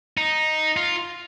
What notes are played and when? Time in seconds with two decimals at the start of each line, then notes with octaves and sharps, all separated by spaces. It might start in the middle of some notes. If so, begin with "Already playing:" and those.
0.17 D#4
0.77 F4